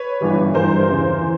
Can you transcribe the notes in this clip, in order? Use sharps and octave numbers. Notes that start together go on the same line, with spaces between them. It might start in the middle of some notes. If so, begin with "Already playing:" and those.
Already playing: B4 C#5
G1 G2 E3 G3
G1 G2 E3 G3 A#4 C5
E2 C#3 E3
E3